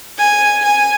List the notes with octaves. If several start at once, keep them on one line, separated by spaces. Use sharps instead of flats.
G#5
G#5